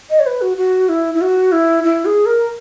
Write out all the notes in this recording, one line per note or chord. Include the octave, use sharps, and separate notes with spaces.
D#5
C#5
B4
F#4
F#4
E4
E4
F#4
E4
E4
G#4
A#4